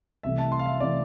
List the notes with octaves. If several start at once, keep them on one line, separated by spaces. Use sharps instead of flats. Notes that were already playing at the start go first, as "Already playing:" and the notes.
C2 C3 E3 A3 E5
A5
C6
F5
E5
C3 E3 A3 D5